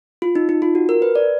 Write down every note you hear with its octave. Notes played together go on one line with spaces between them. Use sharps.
F4
D#4
D#4
F4
F#4
A#4
B4
D5